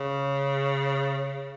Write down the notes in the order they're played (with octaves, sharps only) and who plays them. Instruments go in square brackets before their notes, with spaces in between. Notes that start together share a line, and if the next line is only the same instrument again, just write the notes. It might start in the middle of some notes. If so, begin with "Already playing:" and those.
Already playing: [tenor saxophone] C#3